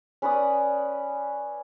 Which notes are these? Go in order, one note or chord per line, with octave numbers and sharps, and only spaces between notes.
C#4 B4 D5 D#6